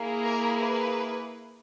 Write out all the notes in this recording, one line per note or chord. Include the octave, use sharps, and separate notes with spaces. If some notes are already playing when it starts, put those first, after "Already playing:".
Already playing: A#3 E4 G#4
A#4
B4